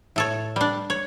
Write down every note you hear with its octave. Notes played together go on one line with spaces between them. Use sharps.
A2 A4 C#5
G3 D4
C#5